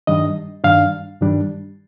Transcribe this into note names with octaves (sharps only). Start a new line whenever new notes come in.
G2 D#3 G3 D4 D#5
G2 D#3 G3 D4 F5
G2 D#3 G3 D4